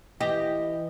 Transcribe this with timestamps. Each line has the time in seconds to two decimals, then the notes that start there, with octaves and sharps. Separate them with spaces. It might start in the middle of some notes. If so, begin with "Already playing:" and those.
0.21 E3 G4 D#5